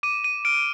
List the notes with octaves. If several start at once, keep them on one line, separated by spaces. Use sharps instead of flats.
D6 D#7
D#7
F6 D7